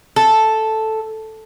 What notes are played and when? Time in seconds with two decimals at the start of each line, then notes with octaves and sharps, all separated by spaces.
0.16 A4